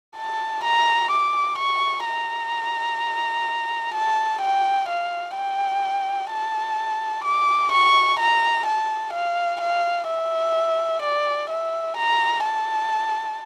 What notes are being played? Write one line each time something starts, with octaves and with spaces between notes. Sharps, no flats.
A5
A#5
D6
C#6
A#5
A5
G5
F5
G5
A5
D6
C#6
A#5
A5
F5
F5
E5
D5
E5
A#5
A5